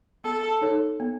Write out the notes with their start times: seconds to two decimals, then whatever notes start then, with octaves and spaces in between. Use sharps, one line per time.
0.24 B3 A4
0.62 D#4 A4 C#5
1.00 B3